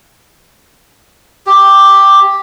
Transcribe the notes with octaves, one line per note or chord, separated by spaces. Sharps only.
G4